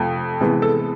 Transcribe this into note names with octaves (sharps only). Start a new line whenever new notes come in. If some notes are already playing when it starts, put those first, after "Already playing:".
Already playing: F2 C3 F3 A3
C3 E3 G#3 B3
A4